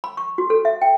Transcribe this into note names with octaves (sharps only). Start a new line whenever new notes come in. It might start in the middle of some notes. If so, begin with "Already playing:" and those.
B5
C#6
F#4
A4
E5
G5